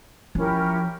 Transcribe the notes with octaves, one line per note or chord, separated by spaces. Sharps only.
F3 C#4 E4 G4 A#4